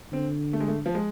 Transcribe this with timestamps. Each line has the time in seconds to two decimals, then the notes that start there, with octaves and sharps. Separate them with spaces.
0.12 D3 C4
0.53 A3
0.60 G#3
0.68 A3
0.86 F3
0.95 G#3